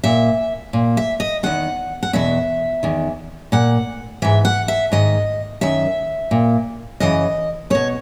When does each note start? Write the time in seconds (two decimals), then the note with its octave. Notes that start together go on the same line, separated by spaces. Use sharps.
0.04 A#2 E5
0.73 A#2
0.97 E5
1.20 D#5
1.43 E2 D#3 F#5
2.03 F#5
2.13 E2 B2 E5
2.83 E2 D#3
3.52 A#2 F#5
4.22 G#2 E3 E5
4.45 F#5
4.68 E5
4.92 G#2 D#3 D#5
5.61 F#2 D#3 E5
6.31 A#2
7.00 F#2 C#3 E3 D#5
7.70 E2 B2 C#5